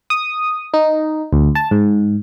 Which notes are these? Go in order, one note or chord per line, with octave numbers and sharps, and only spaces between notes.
D#6
D#4
D2
A5
G#2